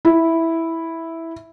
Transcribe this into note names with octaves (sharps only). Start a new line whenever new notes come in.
E4